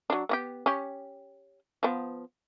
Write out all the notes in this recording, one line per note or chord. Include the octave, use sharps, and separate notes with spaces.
F#3 D4
B3 F#4 G4
C#4 G4
F3 B3